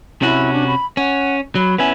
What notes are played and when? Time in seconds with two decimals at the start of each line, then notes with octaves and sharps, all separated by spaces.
0.22 C3 C#4 E4 F#4
0.52 D4
0.67 B5
0.97 C#4 F#5
1.55 F#3 B5
1.78 B3 C#4 E4 G#5